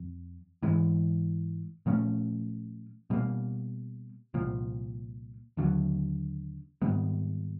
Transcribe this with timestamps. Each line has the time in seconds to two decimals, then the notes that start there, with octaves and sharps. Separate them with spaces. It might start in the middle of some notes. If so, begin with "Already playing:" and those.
Already playing: F2
0.63 G#2 E3 G#3
1.86 A#2 F3 A3 C#4
3.10 B2 G3 A#3
4.34 C2 A#2 F3
5.57 D#2 D3 F#3
6.82 G#2 D#3 G3 B3